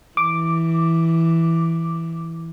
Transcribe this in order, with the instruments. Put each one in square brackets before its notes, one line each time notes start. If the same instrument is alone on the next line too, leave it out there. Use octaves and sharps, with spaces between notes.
[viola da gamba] E3 [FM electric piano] D6